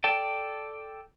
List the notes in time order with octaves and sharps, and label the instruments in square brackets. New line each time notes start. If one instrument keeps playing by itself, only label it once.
[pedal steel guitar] A4 D5 G5 A5